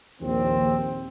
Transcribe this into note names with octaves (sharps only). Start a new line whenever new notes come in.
A#1 D#2 C4